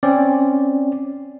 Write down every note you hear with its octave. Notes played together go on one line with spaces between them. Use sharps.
C4 C#4 D5